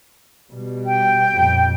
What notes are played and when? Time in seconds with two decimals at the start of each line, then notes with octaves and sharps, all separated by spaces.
0.53 B2 G3
0.86 G5
1.33 F2 A#2